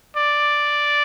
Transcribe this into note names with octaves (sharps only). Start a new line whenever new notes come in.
D5